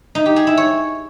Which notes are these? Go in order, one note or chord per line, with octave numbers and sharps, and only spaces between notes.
D#4
G4
G#4
E4
C#5